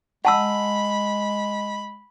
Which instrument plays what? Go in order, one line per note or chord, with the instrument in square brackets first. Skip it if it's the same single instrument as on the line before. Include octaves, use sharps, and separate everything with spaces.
[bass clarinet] G#3 [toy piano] F#5 A5 E6 [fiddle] B5